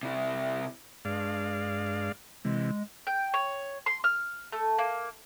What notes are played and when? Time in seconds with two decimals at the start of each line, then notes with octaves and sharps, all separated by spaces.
0.03 C3 E4
1.05 G2 G#3 D5 F5
2.45 C3 E3 G#3
3.07 G5
3.34 C#5
3.86 C6
4.04 F6
4.52 A3
4.78 A#3